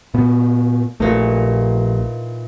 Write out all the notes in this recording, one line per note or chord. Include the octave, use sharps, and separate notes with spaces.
A#2 B3
A#1 A#2 E3 A3 D#4